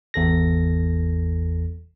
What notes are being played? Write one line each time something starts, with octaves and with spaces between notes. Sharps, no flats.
G#1 E2 A4 A#6